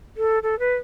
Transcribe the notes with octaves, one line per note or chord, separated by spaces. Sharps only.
A4
A4
B4